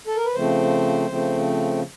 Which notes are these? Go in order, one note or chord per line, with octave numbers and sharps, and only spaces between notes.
A4
A#4
B4
C#3 F3 A3 C4 C5
C#3 F3 A3 C4